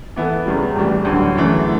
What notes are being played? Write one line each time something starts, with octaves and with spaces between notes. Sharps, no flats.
E3 B3 E4 A4
E2 C#3 G3
A2 E3 G3
D2 D3 F#3
F#2 C#3 E3 A3